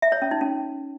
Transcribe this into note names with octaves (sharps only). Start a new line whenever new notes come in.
E5
C#5
C#4
D#4
C#4